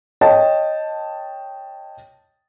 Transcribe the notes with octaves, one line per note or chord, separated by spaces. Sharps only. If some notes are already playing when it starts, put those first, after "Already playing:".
C#5 D#5 G5 A5